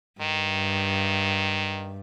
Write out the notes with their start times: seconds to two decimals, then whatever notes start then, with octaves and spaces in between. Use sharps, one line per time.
0.21 G2 D#3